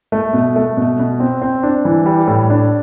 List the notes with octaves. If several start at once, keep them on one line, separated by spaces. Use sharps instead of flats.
A3
B2
A3
B2
B2
C4
C4
D4
E3
G3
A2
D4